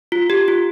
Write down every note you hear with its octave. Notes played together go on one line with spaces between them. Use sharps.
F4
G4
F4